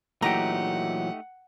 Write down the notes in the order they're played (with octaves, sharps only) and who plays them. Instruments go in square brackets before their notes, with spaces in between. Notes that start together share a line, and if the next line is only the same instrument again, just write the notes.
[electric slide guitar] A#2 E3 F#3 [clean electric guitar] A3 D#4 G4 [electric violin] F#5 [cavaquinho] A#5